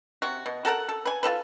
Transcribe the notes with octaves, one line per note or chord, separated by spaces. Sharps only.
C3 F#4
B2
F#4 A4 A#4 F#5
A4
B4 G#5
F4 F#4 A4 B4